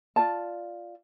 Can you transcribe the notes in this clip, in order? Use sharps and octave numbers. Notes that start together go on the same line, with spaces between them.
F4 D5 A5